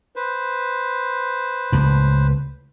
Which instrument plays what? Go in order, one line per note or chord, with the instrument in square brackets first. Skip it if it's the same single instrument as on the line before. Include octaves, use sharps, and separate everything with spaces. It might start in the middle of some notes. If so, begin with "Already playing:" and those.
[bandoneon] B4 C5
[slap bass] C#2 A2